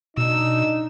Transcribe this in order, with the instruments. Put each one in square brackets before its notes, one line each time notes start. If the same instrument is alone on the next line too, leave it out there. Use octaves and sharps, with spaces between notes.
[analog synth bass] B2 [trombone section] D4 D#4 [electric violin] E6